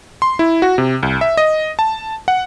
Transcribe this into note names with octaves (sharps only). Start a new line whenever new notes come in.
C6
E4
F#4
C3
C2
E5
D#5
A5
F#5